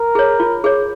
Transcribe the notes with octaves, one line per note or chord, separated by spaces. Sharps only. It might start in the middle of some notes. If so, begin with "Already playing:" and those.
Already playing: A#4
G#4 C#5
F4
G#4 C#5